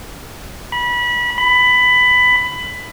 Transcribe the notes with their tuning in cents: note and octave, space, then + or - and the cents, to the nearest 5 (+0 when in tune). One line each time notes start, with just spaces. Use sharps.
B5 -25
B5 +15